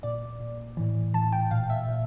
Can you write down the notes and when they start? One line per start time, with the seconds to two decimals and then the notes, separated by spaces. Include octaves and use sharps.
0.03 A#2 D5
0.40 A#2
0.77 A2 E3
1.14 A2 E3 A5
1.32 G5
1.51 A#2 F5
1.70 E5
1.89 A#2